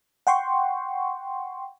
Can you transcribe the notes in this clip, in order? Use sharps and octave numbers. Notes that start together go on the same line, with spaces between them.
F#5 G5 C6 C#6